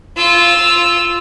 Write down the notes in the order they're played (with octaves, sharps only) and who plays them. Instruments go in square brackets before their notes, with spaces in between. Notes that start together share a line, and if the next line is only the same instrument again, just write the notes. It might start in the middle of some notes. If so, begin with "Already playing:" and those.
[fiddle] F4 E6